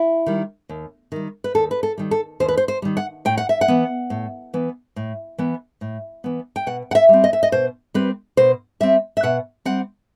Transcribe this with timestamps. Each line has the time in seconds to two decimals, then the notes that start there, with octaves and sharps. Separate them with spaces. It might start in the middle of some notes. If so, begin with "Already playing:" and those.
Already playing: E4
0.26 D#3 G3
0.69 D#2
1.12 D#3 G3
1.44 B4
1.54 D#2 A4
1.71 B4
1.83 A4
1.98 D#3 G3
2.11 A4
2.40 D#2 C5
2.48 B4
2.57 C5
2.68 C5
2.82 D#3 G3
2.97 F#5
3.25 A2 G5
3.38 F#5
3.49 E5
3.61 F#5
3.68 E3 B3
4.10 A2
4.54 E3 B3
4.96 A2
5.38 E3 B3
5.81 A2
6.24 E3 B3
6.56 G5
6.67 B2 F#5
6.91 F#5
6.95 E5
7.09 G3 C4
7.24 D#5
7.33 E5
7.43 D#5
7.52 B2 C5
7.94 G3 C4 B4
8.37 B2 C5
8.80 G3 C4 E5
9.17 E5
9.23 B2 F#5
9.65 G3 C4 F#5